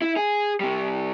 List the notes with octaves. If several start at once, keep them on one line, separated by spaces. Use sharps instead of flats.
E4
G#4
C3 G3